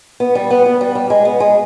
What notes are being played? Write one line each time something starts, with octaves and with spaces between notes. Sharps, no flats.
B3
G3
B3
B3
G3
G3
G#3
B3
G#3